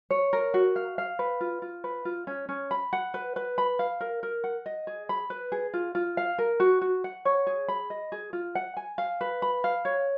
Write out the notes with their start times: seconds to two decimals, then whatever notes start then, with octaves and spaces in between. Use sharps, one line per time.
0.11 C#5
0.33 A#4
0.54 F#4
0.76 F5
0.98 F5
1.19 B4
1.41 F4
1.62 F4
1.84 B4
2.05 F4
2.27 C#4
2.49 C#4
2.71 B5
2.93 F#5
3.14 B4
3.36 B4
3.58 B5
3.79 F5
4.00 A#4
4.23 A#4
4.44 F#5
4.66 D#5
4.87 G#4
5.09 B5
5.30 B4
5.52 G#4
5.74 F4
5.95 F4
6.17 F5
6.38 A#4
6.60 F#4
6.81 F#4
7.04 F#5
7.25 C#5
7.47 G#4
7.68 B5
7.90 D#5
8.12 G#4
8.33 F4
8.55 F#5
8.77 G#5
8.98 F5
9.21 B4
9.42 B5
9.64 F5
9.85 C#5